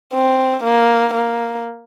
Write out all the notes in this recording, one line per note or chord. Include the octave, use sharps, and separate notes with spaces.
C4
A#3
A#3